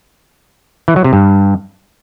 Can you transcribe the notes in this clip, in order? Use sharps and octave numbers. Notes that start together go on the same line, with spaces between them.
E3
F#3
C3
G2